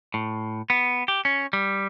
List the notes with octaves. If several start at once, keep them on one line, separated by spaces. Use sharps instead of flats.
A2
B3
G4
C#4
G3